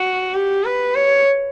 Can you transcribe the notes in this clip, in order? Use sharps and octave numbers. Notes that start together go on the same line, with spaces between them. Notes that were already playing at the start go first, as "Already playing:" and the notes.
Already playing: F#4
G4
B4
C#5